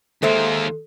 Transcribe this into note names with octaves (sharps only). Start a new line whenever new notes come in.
D#2 G#3 A#3 A4 C5 E5